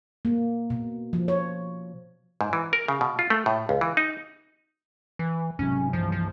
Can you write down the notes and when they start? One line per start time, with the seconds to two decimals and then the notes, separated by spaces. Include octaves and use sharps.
0.25 A#3
0.70 B2
1.13 F3
1.28 C#5
2.41 G#2
2.53 E3
2.73 A#4
2.88 C#3
3.01 B2
3.19 F4
3.30 A3
3.46 A2
3.69 C#2
3.81 E3
3.97 D#4
5.19 E3
5.59 G#2 C3 F#3 C#4
5.93 G2 E3 F3
6.12 F3